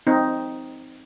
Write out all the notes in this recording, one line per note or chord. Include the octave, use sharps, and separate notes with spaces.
C4 D#4